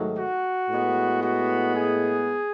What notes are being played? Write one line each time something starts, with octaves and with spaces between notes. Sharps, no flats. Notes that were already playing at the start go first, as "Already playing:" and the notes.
Already playing: G#2 D#3 F#3 A3
F#4
A2 G#3 B3
F#4
G#4